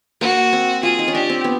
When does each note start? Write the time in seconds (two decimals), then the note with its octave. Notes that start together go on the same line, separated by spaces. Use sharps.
0.21 A#3 F#4
0.53 C4
0.83 F4 G#4
0.99 D#4
1.08 C#4
1.14 D4 G4
1.30 C4
1.44 B3